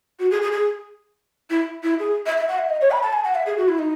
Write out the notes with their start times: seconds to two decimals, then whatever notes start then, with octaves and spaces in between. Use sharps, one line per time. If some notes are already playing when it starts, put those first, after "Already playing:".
0.19 F#4
0.31 G#4
0.42 G#4
0.52 G#4
1.50 E4
1.83 E4
1.99 G#4
2.26 E5
2.37 E5
2.48 F#5
2.58 E5
2.69 D#5
2.81 C#5
2.91 B5
3.02 A5
3.13 G#5
3.24 F#5
3.35 E5
3.46 G#4
3.58 F#4
3.68 E4
3.79 D#4